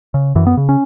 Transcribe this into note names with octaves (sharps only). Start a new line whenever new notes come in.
C#3
F#2 E3
B3
C#3
C#4